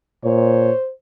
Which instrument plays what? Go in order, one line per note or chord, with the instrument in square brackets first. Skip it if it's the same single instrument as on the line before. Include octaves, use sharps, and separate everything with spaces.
[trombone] A#2 [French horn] C5 [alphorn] C#5